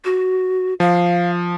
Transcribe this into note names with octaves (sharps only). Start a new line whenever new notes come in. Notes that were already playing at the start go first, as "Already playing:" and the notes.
F#4
F3 F5